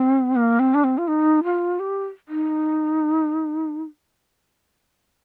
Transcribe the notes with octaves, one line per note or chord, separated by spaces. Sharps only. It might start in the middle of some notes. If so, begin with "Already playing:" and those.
Already playing: C4
A#3
C4
D4
C4
F4
D#4
F4
G4
D#4